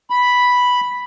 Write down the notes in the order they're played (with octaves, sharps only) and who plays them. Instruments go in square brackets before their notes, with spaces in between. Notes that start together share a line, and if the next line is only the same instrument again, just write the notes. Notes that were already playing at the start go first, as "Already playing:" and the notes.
[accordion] B5